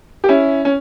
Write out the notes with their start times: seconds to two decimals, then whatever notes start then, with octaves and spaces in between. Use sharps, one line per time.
0.24 G4
0.28 C#4 E4
0.65 C#4